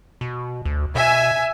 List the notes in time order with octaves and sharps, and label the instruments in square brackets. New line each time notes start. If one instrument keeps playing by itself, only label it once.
[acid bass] B2
D2
[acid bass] B2 [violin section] E5 G#5